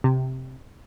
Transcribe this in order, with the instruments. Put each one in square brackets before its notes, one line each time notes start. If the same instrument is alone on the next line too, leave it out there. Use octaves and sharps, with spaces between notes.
[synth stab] C3